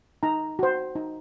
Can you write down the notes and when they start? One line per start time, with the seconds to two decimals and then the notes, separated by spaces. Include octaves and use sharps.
0.23 D#4 A#5
0.59 F#4 C5
0.95 D#4